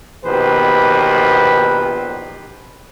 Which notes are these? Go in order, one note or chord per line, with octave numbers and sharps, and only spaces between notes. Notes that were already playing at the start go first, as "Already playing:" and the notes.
A#1 B2 D#3 G4 B4 C5